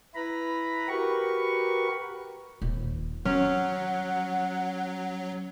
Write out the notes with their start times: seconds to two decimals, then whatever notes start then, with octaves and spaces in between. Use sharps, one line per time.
0.15 E4 B4 A#5 B5
0.88 F#4 G4 A#4 B4 C#6
2.62 D#1
3.25 F#3 C#4 F#5